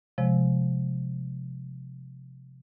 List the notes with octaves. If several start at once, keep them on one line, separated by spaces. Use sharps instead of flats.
C3 F3 G#3